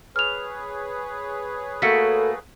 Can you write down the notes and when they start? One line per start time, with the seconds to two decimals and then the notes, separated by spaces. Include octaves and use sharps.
0.16 G#4 B4 C#5 F6 F7
1.82 A3 A#3 F#4 A4 B6 C#7